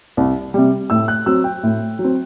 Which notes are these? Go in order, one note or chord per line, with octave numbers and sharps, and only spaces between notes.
C2
C3 G3
A2 E6
F#6
F#3 C4 E6
G5
A2
F#3
C4